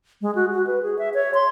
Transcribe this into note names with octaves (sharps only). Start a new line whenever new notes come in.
G#3
F#4
F#4
B4
G#4
E5
C#5
C6